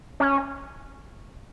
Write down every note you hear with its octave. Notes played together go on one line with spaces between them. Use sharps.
C#4